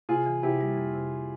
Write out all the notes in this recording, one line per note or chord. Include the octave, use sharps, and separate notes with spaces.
C3 F4 G#4
E3
C3 E4 G4
G3
F2
C3